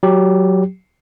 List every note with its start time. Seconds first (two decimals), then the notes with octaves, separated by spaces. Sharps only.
0.03 F#3 G4